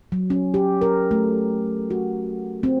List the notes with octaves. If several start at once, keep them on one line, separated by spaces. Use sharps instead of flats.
F#3
C#4
G4
A#4
A3
F#4
C4